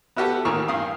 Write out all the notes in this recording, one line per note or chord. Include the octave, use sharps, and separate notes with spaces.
B3 E4 F#4 G4 A4 B4
A1 D#2 D#3 E3 C#6
G2 F5 D#6